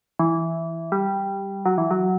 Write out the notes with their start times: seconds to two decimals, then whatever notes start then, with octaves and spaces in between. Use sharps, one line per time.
0.19 E3
0.92 G3
1.65 F#3
1.78 E3
1.91 F#3